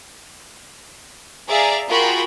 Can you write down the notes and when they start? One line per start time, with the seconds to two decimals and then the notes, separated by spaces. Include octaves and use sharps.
1.47 G#4 D5 E5 F5 A#5
1.90 F4 F#4 G#4 A#4 G5 B5